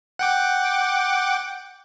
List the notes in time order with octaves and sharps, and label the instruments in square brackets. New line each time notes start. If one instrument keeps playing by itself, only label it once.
[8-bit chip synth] F#5 G5 D6